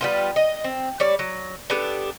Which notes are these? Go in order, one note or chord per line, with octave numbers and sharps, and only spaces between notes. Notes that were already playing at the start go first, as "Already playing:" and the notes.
G3 B3 F4
D#5
C4
G3 C#5 D5
F#3
B3 D4 G4 A4